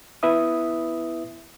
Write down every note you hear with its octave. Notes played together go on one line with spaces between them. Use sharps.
B3 E4 B4 E5 D#6